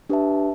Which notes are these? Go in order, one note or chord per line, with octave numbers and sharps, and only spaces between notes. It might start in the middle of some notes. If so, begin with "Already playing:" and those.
D4 G4 B4 E5 A5